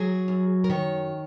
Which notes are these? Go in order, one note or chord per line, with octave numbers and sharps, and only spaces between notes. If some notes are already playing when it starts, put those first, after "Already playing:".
Already playing: F#3 G#4
F#2
A#4
D#3 C#5